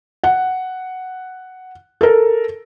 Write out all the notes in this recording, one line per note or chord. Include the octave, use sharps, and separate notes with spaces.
F#5
A4 A#4